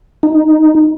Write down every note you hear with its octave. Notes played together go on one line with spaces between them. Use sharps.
D#4